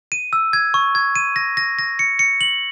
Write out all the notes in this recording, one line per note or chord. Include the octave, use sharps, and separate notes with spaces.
D#7
E6
G#6
C#6
G#6
D#7
A#6
A#6
A#6
C#7
C#7
F#7